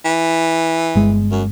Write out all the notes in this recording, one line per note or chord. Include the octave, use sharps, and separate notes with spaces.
E3
G1 G#3
F#2